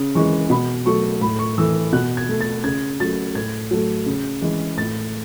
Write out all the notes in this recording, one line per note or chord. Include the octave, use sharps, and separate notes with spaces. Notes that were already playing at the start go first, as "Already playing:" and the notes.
Already playing: C#3
E3 G#3 C#6
B2 B5
F#3 A3 C#6
A2 B5
C#6
E3 A3 E6
B2 F#6
G#6
A3
A6
C#3 G#6
F#3 A3 A6
A2 G#6
F#3 A3
C#3
E3 G#3
A2 A6